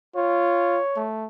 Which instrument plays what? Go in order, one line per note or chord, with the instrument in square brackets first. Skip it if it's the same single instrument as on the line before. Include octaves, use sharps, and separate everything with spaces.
[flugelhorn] F4 [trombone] C#5
[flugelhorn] A3